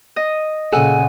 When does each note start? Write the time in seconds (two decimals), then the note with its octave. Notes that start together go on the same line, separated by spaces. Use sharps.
0.16 D#5
0.73 A#2 C#3 G#4 A4 F#5 G#5 E6